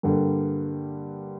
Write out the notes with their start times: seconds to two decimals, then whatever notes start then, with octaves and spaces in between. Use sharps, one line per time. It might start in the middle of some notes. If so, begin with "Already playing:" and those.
0.03 G2 D3 G3 A#3